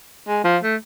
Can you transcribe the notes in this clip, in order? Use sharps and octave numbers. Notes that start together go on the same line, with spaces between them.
G#3
F3
A3